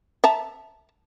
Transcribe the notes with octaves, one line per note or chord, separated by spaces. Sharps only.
E5 A5 A#5